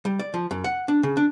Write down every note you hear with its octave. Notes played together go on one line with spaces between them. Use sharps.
G3
D5
F3
F#2
F#5
D4
C#3
D4